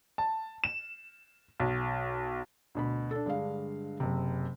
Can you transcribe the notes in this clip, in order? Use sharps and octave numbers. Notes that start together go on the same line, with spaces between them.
A5
E7
B1
D2 B2 B5
D4 A4
G2 D3 G#3 F5
F#1 C3